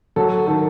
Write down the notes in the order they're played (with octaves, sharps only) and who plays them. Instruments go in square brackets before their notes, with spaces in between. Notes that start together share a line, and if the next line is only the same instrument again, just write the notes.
[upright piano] F#3 A4
D#3 A4